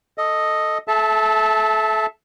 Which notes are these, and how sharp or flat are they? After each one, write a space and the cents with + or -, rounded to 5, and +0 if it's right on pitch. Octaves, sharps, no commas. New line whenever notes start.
A4 +0 D#5 +0
A4 -30 E5 +0 A5 +0